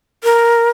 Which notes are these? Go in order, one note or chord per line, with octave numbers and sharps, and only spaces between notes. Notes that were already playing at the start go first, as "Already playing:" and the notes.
A#4